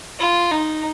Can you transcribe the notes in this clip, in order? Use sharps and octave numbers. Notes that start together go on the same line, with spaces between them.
F4
D#4